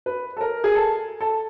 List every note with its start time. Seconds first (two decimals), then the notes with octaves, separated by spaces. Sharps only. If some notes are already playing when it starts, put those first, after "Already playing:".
0.06 B4
0.37 A4
0.41 A#4
0.64 G#4
0.75 A4
1.21 A4